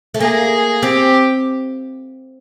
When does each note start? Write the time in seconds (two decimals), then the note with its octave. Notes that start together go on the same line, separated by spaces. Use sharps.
0.14 A3
0.20 A#3 G#4
0.83 C4 G4